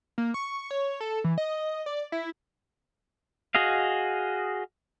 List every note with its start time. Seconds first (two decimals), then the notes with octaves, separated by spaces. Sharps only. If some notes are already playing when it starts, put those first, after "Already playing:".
0.18 A#3
0.34 C#6
0.71 C#5
1.00 A4
1.24 E3
1.38 D#5
1.86 D5
2.12 E4
3.55 F#4 G#4 D#5 F5